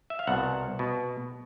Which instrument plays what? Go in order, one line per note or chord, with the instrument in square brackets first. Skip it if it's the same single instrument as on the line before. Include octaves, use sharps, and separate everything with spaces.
[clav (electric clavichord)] E5
F5
C2 B2 F#5
B2